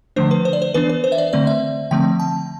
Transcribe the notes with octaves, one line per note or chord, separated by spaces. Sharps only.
D3 F3 A3 D4 C5
B4
C5
D5
C5
E3 B3 D4 B4
B4
C5
E5
D5
D3 A3 C4 D5
E5
D3 F3 A3 C4 G5
A5